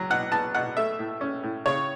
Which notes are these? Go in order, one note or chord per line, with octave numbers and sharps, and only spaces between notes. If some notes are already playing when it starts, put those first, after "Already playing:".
Already playing: C#2 F#3
B2 F#5
B3 A5
B2 F#5
A3 E5
A2
C#4
A2
C#3 C#5